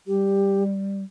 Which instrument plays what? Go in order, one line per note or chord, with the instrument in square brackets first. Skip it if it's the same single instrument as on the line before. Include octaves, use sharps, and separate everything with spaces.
[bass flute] G3 [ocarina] G4